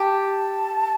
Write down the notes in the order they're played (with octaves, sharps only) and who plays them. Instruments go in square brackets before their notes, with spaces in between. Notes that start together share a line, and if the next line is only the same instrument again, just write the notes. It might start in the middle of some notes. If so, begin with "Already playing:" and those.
Already playing: [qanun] G4 [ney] A5